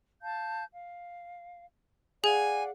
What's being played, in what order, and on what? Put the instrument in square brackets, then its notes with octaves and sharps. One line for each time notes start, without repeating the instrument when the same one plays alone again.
[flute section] F5 A5 G6
F5
[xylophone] G#4 [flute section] D5 F5 F#5 [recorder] G#5